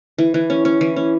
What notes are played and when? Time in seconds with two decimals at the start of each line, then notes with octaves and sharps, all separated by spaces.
0.18 E3
0.34 E3
0.50 C#4
0.65 C#4
0.81 E3
0.96 C#4